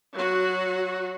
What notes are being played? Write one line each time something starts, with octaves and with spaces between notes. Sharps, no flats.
F#3 F#4